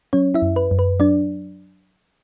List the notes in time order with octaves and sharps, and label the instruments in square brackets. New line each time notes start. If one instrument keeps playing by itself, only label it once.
[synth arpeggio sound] F#3 C#4 C#5
E4 E5
F#2
B4
F#2
B4
F#3 D4 D5